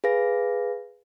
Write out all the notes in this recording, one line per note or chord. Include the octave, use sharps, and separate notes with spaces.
G#4 B4 F5 A#6